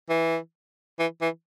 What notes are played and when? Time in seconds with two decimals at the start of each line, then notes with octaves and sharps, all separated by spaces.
0.09 E3
0.99 E3
1.22 E3